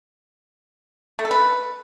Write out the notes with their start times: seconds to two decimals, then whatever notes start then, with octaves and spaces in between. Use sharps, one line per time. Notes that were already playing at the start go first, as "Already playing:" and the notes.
1.19 A3
1.25 A4
1.31 B4